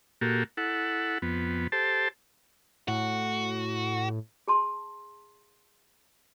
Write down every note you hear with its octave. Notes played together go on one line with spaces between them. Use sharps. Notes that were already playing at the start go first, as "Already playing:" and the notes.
A#2 A#3 F#4 G4 A4
E4 A4 F#5
F2 B3
G4 A4 C5 A5
A2 F#4
G#4 A5 C6